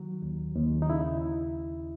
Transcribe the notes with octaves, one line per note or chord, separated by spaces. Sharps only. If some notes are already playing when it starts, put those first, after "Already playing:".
Already playing: D#3 F#3
D#2
D#2
D#4
C#3 E4